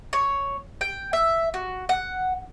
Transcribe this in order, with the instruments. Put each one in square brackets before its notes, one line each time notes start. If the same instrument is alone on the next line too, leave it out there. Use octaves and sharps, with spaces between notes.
[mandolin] C#5
G5
E5
F#4
F#5